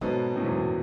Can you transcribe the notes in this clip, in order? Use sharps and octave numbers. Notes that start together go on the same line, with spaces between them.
G#2 B2 F#3 B3 F#4 A4
F#2 A2
E2 G#2
F#2